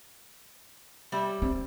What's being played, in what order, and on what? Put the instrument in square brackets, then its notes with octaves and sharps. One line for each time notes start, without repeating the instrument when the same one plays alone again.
[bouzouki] G3 C#4 E5
[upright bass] C4